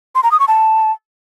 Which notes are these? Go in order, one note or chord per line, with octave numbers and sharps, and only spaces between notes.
C6
A#5
D#6
C#6
A5